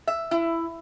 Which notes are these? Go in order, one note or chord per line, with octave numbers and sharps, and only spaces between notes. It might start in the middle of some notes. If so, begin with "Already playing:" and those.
E5
E4